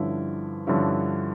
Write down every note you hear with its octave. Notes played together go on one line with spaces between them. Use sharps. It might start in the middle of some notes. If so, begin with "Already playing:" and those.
Already playing: G2 D3 F3 C#4 E4
G2 D3 F3 C#4 E4